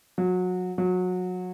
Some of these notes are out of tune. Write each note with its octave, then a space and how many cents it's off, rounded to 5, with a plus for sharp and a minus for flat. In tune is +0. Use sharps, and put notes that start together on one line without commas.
F#3 -25
F#3 -25